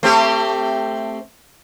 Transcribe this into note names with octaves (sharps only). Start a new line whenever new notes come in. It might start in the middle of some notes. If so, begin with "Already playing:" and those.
A3 C4 G4